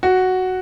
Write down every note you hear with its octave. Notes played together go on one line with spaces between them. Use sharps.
F#4